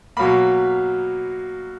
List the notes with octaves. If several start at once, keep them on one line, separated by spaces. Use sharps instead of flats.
B2 F#3 A#3 B5